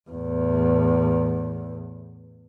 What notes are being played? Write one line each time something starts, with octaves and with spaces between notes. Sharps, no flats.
E2 A2